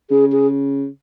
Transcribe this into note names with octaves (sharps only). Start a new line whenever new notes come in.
C#3 G#4
G#4